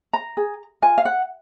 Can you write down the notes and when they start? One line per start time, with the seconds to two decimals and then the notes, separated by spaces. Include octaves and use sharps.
0.13 A#5
0.37 G#4
0.82 F4 G#5
0.98 F5
1.05 F#5